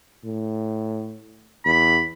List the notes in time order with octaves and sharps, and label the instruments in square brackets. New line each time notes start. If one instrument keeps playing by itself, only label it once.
[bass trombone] A2
[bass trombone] E2 [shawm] B5